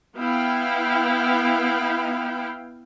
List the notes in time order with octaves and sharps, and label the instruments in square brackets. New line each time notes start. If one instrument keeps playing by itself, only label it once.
[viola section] B3 E4 F5 G5